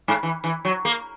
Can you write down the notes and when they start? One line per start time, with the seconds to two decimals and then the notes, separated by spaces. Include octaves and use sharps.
0.08 G#2
0.23 E3
0.44 E3
0.65 F#3
0.85 A#3